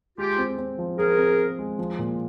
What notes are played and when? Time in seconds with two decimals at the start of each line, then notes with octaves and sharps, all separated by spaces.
0.18 G#3 F4 G4
0.38 C4
0.58 C4
0.78 F3
0.98 F3 G#4 A#4
1.18 C4
1.38 C4
1.59 G#3
1.79 F3
1.99 A#2